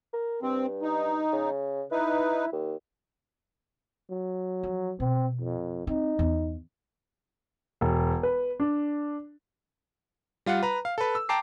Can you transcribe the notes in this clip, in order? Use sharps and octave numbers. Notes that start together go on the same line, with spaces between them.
A#4
G2 C4
D#4
C#3
D#4 E4 B4
D#2
F#3
F3
B2 C4
F2
C4 D#4
E2
E1
B4
D4
G3 F4 F5 F#5
B4 A#5
F5
A4 B4
E6
G5 A5 A#5 D6 C7